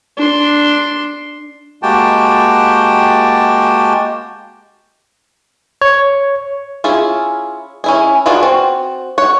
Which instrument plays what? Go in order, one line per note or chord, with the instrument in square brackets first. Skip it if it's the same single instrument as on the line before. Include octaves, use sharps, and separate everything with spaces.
[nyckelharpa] D4 C6
[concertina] G#3 A#3 F#4 G4 G5 A5
[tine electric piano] C#5
[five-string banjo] C#4 E4 F4 G#4
C#4 E4 G#4
B3 D4 F4 F#4 G#4
C4 F#4
C#5 F#5